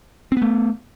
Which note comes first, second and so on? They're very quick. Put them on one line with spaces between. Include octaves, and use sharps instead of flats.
C4 B3 A3